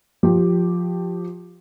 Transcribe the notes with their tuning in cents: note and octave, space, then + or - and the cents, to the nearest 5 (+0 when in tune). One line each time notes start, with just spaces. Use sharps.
F3 +15 G4 +0